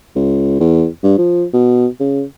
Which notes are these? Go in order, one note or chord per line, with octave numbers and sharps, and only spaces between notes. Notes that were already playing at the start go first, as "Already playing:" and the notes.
C#2
E2
G2
F3
B2
C#3